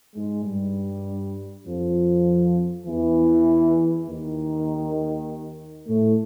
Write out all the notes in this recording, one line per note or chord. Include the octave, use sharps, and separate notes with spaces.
G#2 G#3
G2 G3
F2 F3
E2 E3
D#2 D#3
A2 A3